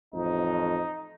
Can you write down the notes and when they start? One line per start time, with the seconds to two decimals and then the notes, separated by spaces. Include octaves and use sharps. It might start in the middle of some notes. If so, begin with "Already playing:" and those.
0.14 A1 F2 D#4